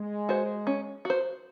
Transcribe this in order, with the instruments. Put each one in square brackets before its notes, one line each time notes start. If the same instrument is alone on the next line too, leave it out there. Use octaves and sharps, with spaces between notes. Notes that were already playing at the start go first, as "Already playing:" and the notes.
Already playing: [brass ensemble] G#3
[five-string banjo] F#4 C5
C#4
F#4 C5